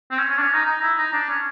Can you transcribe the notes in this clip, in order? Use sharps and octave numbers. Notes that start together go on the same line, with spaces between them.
C4
C#4
C#4
D4
C#4
D#4
D#4
E4
D#4
D4
C#4